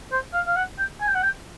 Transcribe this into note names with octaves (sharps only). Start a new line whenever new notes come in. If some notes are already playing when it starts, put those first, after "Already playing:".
C5
F5
F5
F#5
G5
G#5
G5
F#5
G5